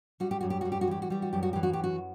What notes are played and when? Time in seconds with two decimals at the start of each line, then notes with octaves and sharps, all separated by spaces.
0.20 G3 F#4
0.31 G4
0.41 F#2 F#4
0.50 G4
0.61 G3 F#4
0.72 G4
0.81 F#4
0.88 E3 G4
1.02 F#4
1.10 G3 G4
1.22 F#4
1.33 F#2 G4
1.43 F#4
1.53 E3 G4
1.63 F#4
1.73 G4
1.79 F#2 F#4